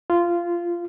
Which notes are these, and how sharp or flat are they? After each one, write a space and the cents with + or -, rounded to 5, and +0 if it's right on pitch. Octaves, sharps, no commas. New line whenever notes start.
F4 -15